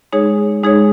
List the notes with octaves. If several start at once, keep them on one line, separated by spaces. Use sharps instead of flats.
G#3 D#4 G#4 C#5
G#3 D#4 G#4 C#5